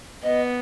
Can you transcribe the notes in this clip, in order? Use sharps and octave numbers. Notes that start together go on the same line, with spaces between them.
B3 D#5